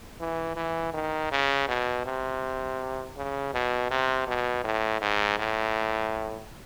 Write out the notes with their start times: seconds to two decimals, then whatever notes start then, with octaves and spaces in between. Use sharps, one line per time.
0.20 E3
0.56 E3
0.94 D#3
1.31 C#3
1.68 B2
2.06 C3
3.17 C#3
3.54 B2
3.91 C3
4.27 B2
4.64 A2
5.01 G#2
5.39 A2